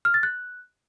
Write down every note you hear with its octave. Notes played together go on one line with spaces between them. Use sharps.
F6
A6
F#6